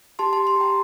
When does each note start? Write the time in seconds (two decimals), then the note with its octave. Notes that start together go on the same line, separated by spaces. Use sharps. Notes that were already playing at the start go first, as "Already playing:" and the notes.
0.19 G4 A5 C6
0.33 A5 C6
0.37 G4
0.47 A5 C6
0.56 G4 G5 A#5